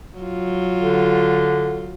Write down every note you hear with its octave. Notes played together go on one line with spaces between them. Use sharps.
F#3 F4
D3